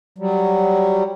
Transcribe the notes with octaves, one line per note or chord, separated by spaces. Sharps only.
F#3 G3